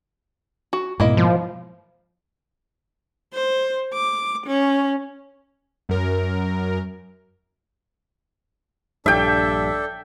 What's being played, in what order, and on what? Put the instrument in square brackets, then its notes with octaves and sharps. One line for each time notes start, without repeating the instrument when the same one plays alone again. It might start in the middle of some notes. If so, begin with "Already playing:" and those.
[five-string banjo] F#4
[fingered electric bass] G#2 B2 [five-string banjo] A#3 E4 D#5
[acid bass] F3
[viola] C5
D6
C#4
[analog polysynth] F#2 A#4
[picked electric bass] A#1 G2 [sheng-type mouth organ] D4 A4 [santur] E5 G5